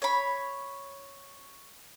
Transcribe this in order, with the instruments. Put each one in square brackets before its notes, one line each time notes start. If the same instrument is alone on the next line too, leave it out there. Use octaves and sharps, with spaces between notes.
[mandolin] C#5 B5